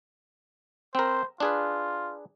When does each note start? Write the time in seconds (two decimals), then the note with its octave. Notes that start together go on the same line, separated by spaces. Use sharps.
0.95 C4 A#4 C5
1.40 D4 F4 G#4 B4